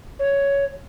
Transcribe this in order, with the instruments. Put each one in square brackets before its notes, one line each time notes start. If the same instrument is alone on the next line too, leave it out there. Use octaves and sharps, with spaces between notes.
[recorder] C#5